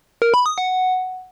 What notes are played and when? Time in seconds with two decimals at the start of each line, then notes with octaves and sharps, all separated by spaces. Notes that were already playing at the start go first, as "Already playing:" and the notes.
0.22 A#4
0.34 B5
0.46 D#6
0.58 F#5